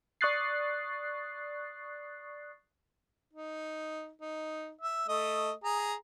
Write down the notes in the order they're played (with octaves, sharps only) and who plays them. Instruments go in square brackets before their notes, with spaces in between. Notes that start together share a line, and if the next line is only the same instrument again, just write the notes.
[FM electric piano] D5 C#6 D#6 F#6 A6 C7
[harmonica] D#4
D#4
E5
A3 D#5
G#4 A#5